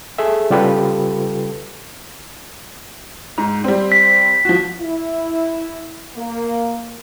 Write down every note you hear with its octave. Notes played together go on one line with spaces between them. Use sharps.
G#4 A4 E5
C#3 G3 F4 G4 A4 B4
G#2
G3 C4
B6
F3 F#4
E4
A#3